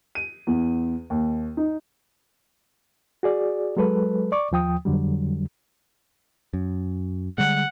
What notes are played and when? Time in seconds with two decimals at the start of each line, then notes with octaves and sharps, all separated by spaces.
0.15 D#7
0.47 E2
1.10 D#2
1.57 D#4
3.23 F#4 G#4 D5
3.77 F#3 G#3 A4 B4
4.32 D5 C#6 D6
4.52 D#2 F3 G5 D#6
4.85 F2 D3 F#3 G3
6.54 F#2
7.38 D3 G3 G#3 F#5